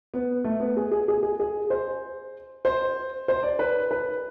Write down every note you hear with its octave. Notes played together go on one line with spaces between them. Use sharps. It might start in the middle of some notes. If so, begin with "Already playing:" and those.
B3
A3
B3
G#4
G#4
G#4
G#4
G#4
C5
C5
C5
D5
B4
B4